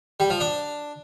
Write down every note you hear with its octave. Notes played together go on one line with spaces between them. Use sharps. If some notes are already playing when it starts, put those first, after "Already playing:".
G3
F3
D4